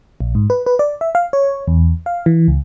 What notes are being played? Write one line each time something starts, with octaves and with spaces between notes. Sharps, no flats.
A#1
G#2
B4
B4
D5
E5
F5
C#5
E2
F5
E3
C#2